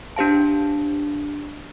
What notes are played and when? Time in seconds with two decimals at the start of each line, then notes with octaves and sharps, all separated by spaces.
0.16 D4 G4 C5 F5 A5